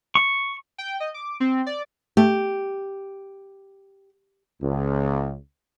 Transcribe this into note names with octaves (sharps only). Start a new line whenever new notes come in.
C#6
G5
D#5
D6
C4
D5
A3 G4
C#2